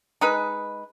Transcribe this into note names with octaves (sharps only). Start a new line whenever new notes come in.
G#3 D#4 B4